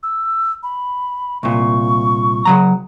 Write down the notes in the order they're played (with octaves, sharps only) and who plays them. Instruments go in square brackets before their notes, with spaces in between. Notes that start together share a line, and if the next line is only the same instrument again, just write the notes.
[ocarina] E6
B5
[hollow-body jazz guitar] C2 A#2 [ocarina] C#6
[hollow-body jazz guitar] C#3 F#3 A#5